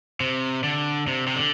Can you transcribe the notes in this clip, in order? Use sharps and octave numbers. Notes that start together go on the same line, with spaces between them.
C3
D3
C3
C3
D3